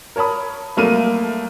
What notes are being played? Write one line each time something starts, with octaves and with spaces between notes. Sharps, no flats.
A#4 C#5 A5 B5 D#6
C2 F#3 A3 A#3 F6 D#7